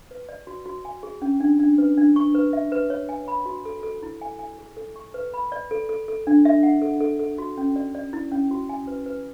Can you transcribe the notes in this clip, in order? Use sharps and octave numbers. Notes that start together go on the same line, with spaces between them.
B4
D5
F#4
F#4
G#5
G#4
C#4
D4
D4
B4
D4
C#6
B4
E5
B4
C#5
G#5
B5
F#4
A4
A4
E4
G#5
G#5
G#4
A4
C#6
B4
B5
D5
A4
A4
A4
D4
E5
F#5
A4
A4
A4
F#4
C#4
D5
D5
E4
C#4
F#4
G#5
B4
B4